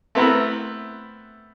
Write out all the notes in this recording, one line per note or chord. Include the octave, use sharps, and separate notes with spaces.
A3 B3 C4 E4 A#4 B4